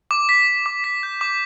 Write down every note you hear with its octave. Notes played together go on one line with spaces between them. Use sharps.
D6
B6
B6
D6
B6
G6
D6